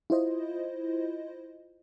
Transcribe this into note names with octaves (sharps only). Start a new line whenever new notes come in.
E4 F4 C5 D#5